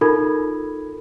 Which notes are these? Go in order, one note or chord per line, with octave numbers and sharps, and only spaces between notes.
D#4 F4 A4 A#4 B5 G#6